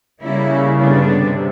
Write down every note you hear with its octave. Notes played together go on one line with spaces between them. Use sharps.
C#3 G3 A#3 C#4 E4
G2 D3 G3 B3 D4
C3